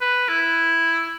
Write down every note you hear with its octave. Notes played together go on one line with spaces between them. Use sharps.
B4
E4